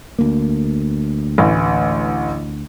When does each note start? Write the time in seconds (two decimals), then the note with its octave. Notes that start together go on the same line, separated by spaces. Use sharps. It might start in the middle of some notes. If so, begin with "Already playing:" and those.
0.19 D2 A#3
1.38 A1 E3